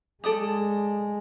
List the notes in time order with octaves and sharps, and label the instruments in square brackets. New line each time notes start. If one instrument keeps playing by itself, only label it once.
[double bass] G#3 [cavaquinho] A4 D5 D#6